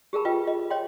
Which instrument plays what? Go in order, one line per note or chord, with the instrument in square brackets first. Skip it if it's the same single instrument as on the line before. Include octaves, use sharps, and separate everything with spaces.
[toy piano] G4 G#4 A#4 A5 B5
F4 G4 B4 D#5 G5
D#5
C#5 D#5 G5 C6